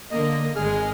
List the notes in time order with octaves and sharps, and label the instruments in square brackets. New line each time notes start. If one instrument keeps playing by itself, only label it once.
[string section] D3 A#3 [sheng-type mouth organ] D#5
[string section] G#1 G#3 [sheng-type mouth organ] G#4 F6